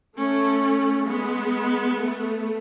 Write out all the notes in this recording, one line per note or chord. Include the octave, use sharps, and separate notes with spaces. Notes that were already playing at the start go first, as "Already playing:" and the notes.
A3 C#4
G#3 B3
A3